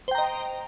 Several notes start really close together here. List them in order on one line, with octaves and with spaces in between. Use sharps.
C5 G5 A#5 D#5